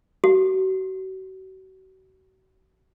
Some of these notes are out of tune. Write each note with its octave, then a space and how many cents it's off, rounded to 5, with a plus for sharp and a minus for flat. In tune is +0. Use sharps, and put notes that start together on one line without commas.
F#4 +40